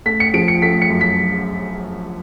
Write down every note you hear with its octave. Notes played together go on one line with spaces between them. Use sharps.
A3 B6
C#7
F3 D7
C#7
A3 B6
C#7
F#2
B6